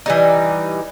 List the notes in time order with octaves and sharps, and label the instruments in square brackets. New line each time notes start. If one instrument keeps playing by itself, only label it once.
[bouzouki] E3 G3 D#4